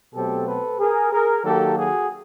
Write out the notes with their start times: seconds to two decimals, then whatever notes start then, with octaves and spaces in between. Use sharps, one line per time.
0.14 B2 F#3 A3 C4 G4 A4
0.47 A4 B4
0.80 G#4 A#4
1.12 G#4 A#4
1.44 D#3 F#3 A#3 G4 A4
1.77 F#4 G#4